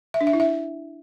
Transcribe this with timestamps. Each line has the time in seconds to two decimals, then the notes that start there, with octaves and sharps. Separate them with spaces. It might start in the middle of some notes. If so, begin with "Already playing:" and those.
0.14 E5
0.21 D4
0.27 E5
0.33 E4
0.40 E5